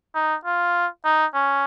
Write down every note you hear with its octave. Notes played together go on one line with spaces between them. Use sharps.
D#4
F4
D#4
C#4